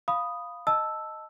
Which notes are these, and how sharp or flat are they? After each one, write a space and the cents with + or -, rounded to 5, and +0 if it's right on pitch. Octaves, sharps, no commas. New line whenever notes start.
F5 +0 B5 +0 D#6 +0
D#5 +0 A5 +0 E6 +0